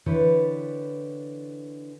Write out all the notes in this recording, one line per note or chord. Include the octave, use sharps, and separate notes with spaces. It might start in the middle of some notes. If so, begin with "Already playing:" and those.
D3 E3 G4 A4 B4 C#5